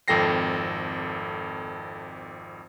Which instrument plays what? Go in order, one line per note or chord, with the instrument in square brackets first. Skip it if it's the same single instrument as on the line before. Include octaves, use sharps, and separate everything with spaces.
[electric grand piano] G#1 F2 A4 G5 A#6 C7